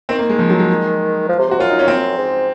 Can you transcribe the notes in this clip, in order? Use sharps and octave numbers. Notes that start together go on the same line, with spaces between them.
D#3 C4
A#3
G#3
F3
F#3
G#3
F3
C3
C3 F#4
F#2 F4
D#4
C#4
C4
G#2